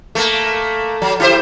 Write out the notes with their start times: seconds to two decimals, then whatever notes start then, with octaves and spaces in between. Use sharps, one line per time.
0.15 A3 A#3
1.02 F#3
1.20 E4 G4 C5